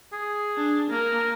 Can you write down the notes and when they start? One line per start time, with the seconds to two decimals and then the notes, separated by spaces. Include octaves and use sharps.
0.13 G#4
0.57 D4
0.90 A#3 A#4